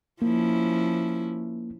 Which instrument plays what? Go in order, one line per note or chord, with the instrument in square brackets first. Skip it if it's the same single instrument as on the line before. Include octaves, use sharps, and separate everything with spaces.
[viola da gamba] F3 C#4 E4 [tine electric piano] A#3